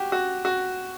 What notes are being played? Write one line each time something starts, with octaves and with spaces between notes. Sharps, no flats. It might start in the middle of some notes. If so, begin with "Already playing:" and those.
Already playing: F#4 G4
F#4
F#4